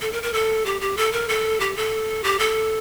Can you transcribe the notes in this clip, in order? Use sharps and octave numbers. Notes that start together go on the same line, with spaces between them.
A4
A#4
A#4
A4
G4
G4
A4
A#4
A4
G4
A4
G4
A4